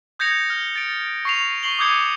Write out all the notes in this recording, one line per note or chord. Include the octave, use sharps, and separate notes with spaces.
D#6 G6 G#6 A#6 C#7 F7
F6
A6 D7
C#6 C7 F7
C#6 C7 F#7 G7
D6 D#6 G6 G#6 C#7